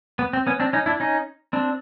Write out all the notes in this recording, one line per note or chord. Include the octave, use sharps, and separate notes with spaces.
B3
C4
B3 C#4
C4 D4
C#4 D#4
D4 E4
C#4 D#4
C4 D4